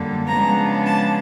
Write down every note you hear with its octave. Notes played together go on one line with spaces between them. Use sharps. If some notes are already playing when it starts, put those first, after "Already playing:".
Already playing: F#2 D3 G3 A#3
C#3 F3 G#3 B3 D4 A#5
A5